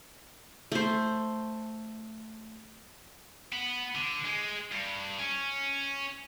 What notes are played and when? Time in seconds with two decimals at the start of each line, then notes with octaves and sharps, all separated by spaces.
0.72 A3 C5
3.53 B3
3.95 D3
4.25 G#3
4.72 G2
5.19 C#4